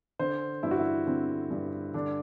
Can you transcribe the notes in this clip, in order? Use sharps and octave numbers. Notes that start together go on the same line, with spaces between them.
D3 C5
G2 E4
F#4
E4
D3 C4
G2
D3 D4